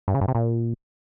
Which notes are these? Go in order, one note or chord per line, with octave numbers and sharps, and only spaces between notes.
G2
C#3
G2
C3
A#2